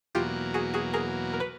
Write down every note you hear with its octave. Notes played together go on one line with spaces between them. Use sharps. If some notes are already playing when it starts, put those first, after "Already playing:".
E2 B2 F#3 A#3 F4 G4
F#4 G#4
F#4 G#4
G#4 A#4
A#4
B4